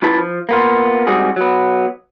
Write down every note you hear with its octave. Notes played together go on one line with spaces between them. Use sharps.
F#2 E4 F4 B4 A5
F3
A#3 B3 F4
G#2 G3 C4 F#4 G#4
F#3 B3